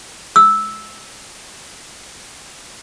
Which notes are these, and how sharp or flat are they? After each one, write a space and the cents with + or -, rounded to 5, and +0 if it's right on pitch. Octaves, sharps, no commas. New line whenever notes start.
E6 -10